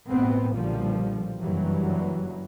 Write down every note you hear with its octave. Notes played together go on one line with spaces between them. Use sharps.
A1 A2 B3 C4
B1 A#2 D3 F3 G3
F#1 G2 E3 F#3 G3